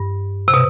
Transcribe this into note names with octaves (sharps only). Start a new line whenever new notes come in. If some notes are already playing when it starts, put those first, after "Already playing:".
Already playing: G2
C3
B2